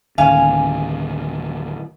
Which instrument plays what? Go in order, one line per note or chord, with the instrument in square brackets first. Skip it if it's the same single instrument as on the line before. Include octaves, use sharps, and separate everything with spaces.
[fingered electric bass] D2 A2 D#3 [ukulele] C#4 G#5 [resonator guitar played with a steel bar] F5